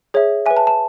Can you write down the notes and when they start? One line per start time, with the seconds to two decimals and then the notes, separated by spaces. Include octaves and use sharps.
0.14 G#4 C#5 E5
0.46 E5 G#5
0.51 B4
0.57 A5
0.67 A5